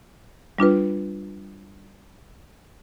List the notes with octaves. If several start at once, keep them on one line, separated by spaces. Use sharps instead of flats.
G3 D4 F4 B4